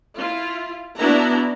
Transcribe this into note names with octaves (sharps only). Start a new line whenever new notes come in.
E4 F4
B3 D4 E4 F#4 A#5